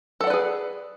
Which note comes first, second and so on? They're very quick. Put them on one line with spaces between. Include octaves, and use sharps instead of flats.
A4 F#5 D5 B4 G#4